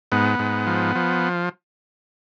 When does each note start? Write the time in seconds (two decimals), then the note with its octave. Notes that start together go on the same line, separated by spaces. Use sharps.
0.12 G#2 B3
0.39 G#2
0.67 F3
0.95 F3